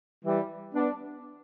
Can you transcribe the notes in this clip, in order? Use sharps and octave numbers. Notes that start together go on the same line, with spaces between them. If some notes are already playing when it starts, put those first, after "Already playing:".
E3 G3
B3 D4